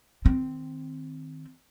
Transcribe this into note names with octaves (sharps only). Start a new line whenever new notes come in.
D#3 C4